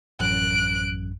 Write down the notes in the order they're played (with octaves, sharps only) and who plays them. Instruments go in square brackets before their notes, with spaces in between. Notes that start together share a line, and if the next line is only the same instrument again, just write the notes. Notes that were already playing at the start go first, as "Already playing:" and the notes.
[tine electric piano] A1 F#2 [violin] F#6 D7